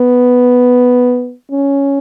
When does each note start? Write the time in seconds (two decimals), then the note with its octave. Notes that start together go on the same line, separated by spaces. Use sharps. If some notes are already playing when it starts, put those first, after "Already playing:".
Already playing: B3
1.51 C#4